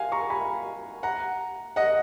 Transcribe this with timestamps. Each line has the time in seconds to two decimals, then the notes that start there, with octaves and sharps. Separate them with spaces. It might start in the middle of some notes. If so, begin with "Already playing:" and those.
Already playing: F5 F#5 G#5
0.12 A#5 C#6
0.30 G#5 B5
1.03 F#5 A#5
1.76 D#5 F#5